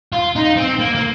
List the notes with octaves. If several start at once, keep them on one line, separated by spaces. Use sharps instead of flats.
F4
D#4
C4
A#3
A#3